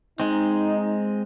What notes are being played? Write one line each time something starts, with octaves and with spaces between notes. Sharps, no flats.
G#3 C4 D#4